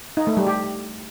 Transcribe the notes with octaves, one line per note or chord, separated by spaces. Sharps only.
D#4
A3
G3
G4